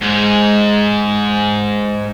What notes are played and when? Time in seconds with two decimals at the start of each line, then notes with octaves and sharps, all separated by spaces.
0.02 G#2 G#3